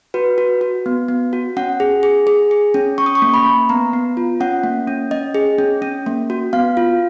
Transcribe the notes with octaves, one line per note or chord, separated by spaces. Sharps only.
F#4 B4
F#4
F#4
B3
B3
F#4
C#4 F#5
G#4
G#4
G#4
G#4
C#4
C#4 C#6
D#6
C#6
A#3
B5
A#3
B3 A#5
B3
F4
C#4 F#5
A#3
C#4
C#4 D#5
G#4
C#4
C#4
A#3
F#4
B3 F5
F4